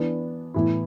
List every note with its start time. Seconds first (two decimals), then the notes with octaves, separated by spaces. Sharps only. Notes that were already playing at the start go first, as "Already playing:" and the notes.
Already playing: E3 B3 D4
0.54 A2 E3 B3 E4